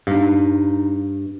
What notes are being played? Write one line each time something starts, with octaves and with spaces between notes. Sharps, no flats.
G2 D#4 F5